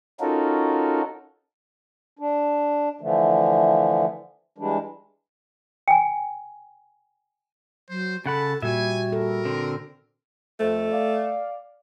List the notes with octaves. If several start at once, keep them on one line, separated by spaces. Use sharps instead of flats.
C#4 D#4 F4 F#4 A4 A#4
D4
D3 E3 F3 A3
E3 G3 G#3 D4
G5 G#5
F#3 C5
C#3 A4 F#5 A5 B5
A#2 G3 F#4 E5 G#5
A4 A#4
D3 C4
F2 A3
D5 F5